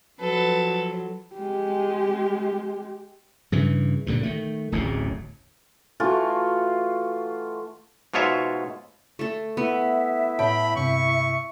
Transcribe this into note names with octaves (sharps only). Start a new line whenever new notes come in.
F3 F#3 A4 B4
G#3 G4
G2 C#3 E3
G2 A#2 D3
D#3 A3
D1 A1 E2 A2
E3 A3 F4 F#4
G#2 B2 F4 C#5 E5
A3 A4
B3 E4 E5
A2 C#5 G5 A5 B5
G2 C3 C#6